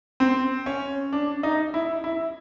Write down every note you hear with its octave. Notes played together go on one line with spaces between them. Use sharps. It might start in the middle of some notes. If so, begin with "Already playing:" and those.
C4
C#4
D4
D#4
E4
E4